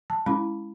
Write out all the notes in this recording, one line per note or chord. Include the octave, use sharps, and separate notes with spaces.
A5
G#3 C#4 E4 B5